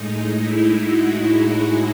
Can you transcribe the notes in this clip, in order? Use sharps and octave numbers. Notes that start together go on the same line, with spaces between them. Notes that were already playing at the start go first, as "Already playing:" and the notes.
Already playing: A2 G#3 D#4
E4
F#4
G#4